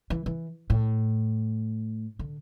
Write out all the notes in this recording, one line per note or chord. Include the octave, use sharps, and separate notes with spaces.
E3
E3
A2
D3